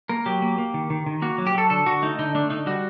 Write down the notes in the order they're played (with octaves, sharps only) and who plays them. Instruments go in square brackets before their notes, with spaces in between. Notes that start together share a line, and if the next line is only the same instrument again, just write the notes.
[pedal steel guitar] A#3 A#4
F#3 G4
A#3
A#3
D#3
D#3
D#3
A#3 F#4
F#3
G4
F#3 A4
D3 A4
D3 F#4
A3 D#4
D3 D#4
A3 D4
D3 D#4
G3 F#4